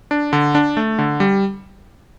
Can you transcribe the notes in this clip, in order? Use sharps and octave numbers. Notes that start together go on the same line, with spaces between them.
D4
D3
D4
A3
D3
G3